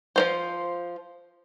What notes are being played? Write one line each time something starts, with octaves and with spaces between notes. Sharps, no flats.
F3 A#3 C5